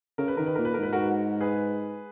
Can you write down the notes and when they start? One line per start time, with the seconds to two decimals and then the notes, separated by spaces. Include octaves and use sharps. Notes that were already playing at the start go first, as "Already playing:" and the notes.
0.18 C#3 A#4
0.28 B4
0.37 D#3 A#4
0.46 B4
0.55 A#2 A#4
0.65 B4
0.74 A#4
0.79 G#2 B4
0.93 F#4 A#4
1.41 G#4 B4